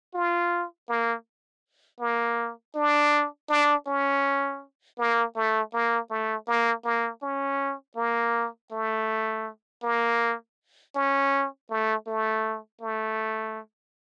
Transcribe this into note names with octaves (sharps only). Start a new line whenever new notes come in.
F4
A#3
A#3
D4
D4
C#4
A#3
A3
A#3
A3
A#3
A#3
C#4
A#3
A3
A#3
C#4
A3
A3
A3